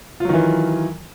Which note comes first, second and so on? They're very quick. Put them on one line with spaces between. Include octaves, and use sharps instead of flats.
F4 F#3 D#3 E3